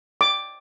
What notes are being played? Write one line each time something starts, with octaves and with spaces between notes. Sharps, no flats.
D6